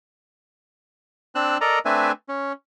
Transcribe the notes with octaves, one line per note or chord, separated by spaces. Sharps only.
C4 D4 E6 F#6
A4 A#4 D5 D#5 A#5
A3 C4 D4 B4 E5 G#5
C#4